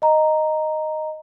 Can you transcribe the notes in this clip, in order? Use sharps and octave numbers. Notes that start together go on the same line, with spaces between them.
D#5 A#5